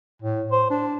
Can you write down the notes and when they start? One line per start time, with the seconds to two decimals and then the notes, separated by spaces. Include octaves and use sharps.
0.22 A2
0.51 C5
0.70 D4